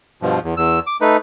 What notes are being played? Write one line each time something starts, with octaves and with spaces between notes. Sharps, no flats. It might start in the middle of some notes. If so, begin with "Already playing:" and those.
G2 B2 F3
E2
E2 E6
D6
A3 D#4 B4